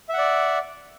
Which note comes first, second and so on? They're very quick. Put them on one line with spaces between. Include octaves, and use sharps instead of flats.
E5 F#5 D5